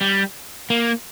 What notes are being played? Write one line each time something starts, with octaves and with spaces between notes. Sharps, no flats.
G3
A#3